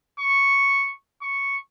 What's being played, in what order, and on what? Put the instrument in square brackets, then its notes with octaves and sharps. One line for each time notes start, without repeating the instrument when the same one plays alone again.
[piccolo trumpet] C#6
C#6